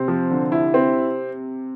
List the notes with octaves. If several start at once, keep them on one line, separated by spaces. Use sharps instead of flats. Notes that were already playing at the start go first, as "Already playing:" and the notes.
Already playing: C3 C4
F3
D3
E4
C4